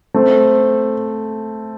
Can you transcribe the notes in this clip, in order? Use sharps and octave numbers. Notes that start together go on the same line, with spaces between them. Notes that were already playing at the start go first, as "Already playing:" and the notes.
A3 C4